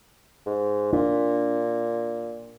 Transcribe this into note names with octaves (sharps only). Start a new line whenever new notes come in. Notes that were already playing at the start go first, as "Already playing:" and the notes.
G#2
A#2 D4